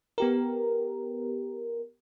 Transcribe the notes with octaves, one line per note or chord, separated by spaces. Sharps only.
B3 G4 A#4